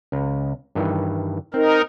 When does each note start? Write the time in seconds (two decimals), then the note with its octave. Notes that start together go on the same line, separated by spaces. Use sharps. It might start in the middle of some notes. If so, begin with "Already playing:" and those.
0.12 C#2
0.75 G2 D#3 E3
1.54 C4 D#4 A#4